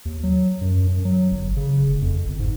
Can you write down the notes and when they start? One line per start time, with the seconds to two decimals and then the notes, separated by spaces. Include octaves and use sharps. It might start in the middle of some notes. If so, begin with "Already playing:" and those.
0.05 D#2
0.23 F#3
0.61 F#2
0.87 F#2
1.05 F#3
1.31 G1
1.56 C#3
1.86 F1
2.02 F2
2.26 G1
2.39 G#2